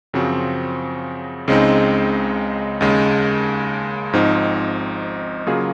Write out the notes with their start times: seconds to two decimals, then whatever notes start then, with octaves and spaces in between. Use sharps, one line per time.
0.13 F#2 C#3 F3 C4 F#4
1.48 C#2 C#3 G#3 C4 D#4
2.81 D#2 C#3 G#3
4.13 G#1 G#2 F3 C4 D#4
5.47 C#3 F#3 A#3 F4 G#4